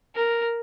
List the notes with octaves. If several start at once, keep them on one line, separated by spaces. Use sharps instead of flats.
A#4